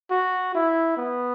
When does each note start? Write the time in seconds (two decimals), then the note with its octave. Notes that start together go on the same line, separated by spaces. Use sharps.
0.11 F#4
0.55 E4
0.97 B3